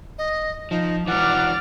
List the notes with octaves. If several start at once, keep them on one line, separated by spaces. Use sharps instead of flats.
D#5
F3 D#4
E3 F#4 D5 F#5 F6